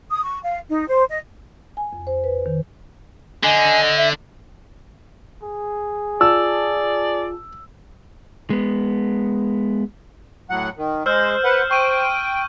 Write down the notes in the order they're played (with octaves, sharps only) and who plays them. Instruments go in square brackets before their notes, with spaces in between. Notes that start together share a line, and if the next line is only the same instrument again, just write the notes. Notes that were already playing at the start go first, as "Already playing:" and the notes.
[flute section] D#6
C#6
F5
D#4
C5
D#5
[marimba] G#5
F2
C5
B4
D#3
[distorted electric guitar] D3 [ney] D#5 [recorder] G#5
[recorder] E5
[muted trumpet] G#4
[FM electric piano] F4 A5 [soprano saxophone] D5 [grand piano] E6
[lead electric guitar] G#3 B3
[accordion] A2 F#3 F#5
D#3
[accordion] G#3 [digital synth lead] C5 [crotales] E6 F6 G6
[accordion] B4 F#5
[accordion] G5 [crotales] C#6 D#7